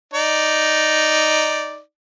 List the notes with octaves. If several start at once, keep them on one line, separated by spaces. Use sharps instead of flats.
D#4 D5